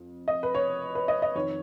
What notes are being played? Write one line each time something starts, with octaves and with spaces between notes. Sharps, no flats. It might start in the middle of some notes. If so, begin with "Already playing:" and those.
Already playing: F2
D#5
B4
C#5
B4
D#5
D#5
F2 D#3 C#5